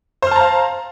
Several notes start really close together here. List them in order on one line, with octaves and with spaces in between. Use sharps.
C5 F6 A5 A#5 F5